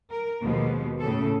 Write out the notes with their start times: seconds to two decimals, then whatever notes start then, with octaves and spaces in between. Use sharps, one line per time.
0.10 A#4
0.42 D#2 B2 F3 G#3 B3
1.00 A2 C#3 A4